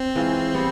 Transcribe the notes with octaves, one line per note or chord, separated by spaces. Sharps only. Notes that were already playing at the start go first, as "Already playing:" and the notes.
Already playing: C4
E3 G#3 C#4 F4
G3 B3 E4